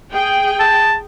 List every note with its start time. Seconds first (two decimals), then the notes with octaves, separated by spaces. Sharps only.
0.12 G#4 G5
0.60 A5